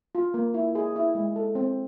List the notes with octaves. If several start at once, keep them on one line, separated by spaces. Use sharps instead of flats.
F4
A#3
E4
G#4
E4
G#3
A4
C4